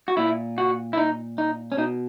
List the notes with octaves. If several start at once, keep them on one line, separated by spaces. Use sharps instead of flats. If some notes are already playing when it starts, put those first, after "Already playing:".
F#4
A#2 E4
F#4
E4
D#4
D#4
C#4
B2 D#4